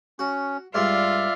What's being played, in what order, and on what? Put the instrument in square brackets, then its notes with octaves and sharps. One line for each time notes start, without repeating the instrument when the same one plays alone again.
[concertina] C#4 [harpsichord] F#4
[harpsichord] G2 G3 G#3 [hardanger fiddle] F4 [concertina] D5 E5 F6